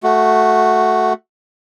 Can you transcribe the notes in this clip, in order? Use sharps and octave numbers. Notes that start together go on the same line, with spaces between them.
A3 F#4